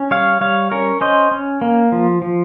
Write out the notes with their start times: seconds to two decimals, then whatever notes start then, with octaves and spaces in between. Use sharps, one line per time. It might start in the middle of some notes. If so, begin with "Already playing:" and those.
Already playing: C#4
0.11 G3 C#5 F5
0.41 G3 C#5 F5
0.71 C#4 A#4 C#5
1.01 C#4 C5 D#5
1.31 C#4
1.61 A#3
1.92 F3
2.22 F3